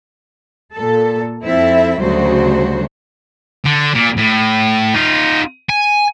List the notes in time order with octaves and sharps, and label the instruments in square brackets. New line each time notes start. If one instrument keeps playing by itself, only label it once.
[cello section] A#2 A4
F2 C4 E4 A4 E5
D2 C#3 F#3 G3 F#4 C5
[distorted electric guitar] D3
A#2
A2
D#4 F4
G#5